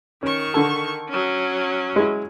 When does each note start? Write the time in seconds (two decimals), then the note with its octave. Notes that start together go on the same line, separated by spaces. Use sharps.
0.23 D#3 C#4 C#6
0.54 D3 A4
1.09 F#3 C#4
1.96 G#3 E4